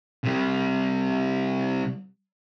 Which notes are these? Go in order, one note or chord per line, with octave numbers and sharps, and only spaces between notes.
C3 G3